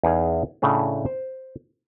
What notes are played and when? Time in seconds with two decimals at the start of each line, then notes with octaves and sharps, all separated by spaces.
0.03 E2 D#4 G#4 F5
0.62 A2 C#3 A3 D4
1.06 C5